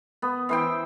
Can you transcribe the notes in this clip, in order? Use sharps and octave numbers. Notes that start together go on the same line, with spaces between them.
B3
E3 C5 G5